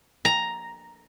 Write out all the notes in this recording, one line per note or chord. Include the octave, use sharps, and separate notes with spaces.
A#5